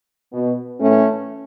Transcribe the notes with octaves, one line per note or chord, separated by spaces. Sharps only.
B2
A2 E3 A3 C#4